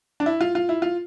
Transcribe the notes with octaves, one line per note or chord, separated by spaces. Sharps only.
D4
E4
F4
F4
E4
F4